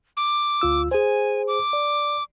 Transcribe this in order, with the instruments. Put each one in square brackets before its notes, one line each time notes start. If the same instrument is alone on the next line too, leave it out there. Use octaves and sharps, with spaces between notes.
[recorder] D6
[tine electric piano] D2 F4 E6
[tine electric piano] G#4 C5 [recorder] G#5
[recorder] D6
[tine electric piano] D5